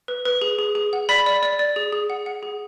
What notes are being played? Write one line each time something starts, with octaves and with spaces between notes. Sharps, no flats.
B4
B4
G#4
G#4
G#4
F#5
D5 B5 B6
D5
D5
D5
G#4
G#4
F#5
F#5
G#4